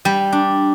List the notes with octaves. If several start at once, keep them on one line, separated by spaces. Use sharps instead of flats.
G3
D4